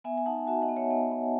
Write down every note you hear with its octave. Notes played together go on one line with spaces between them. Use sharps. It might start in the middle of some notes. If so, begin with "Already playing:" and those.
B3 E5 G#5
G#5
D#4 F#5 A5
F#4 E5 G#5
D#5 F#5
B3
C#5 E5
B3 D#5 F#5
B3